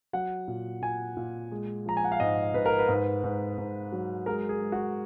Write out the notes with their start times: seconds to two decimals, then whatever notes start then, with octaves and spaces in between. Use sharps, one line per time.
0.13 F#3 F#5
0.48 A#2
0.82 A#2 G#5
1.17 A#2
1.52 G#3
1.86 F3 A#5
1.97 G#5
2.04 F#5
2.12 F5
2.20 G#2 D#5
2.54 G#2 B4
2.66 A#4
2.78 B4
2.88 G#2
3.24 G#2
3.58 G#2
3.92 F#3
4.26 G#3 A#4
4.49 G#4
4.61 G#3
4.72 F#4